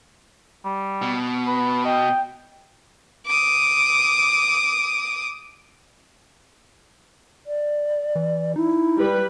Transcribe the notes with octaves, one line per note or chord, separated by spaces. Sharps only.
G3
B2
B4
D#5 G5
D6 D#6
D5
E3
D#4 E4
G3 B4